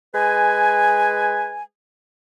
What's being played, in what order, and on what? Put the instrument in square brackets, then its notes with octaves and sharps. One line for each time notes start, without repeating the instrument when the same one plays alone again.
[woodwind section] G#3 B4 G#5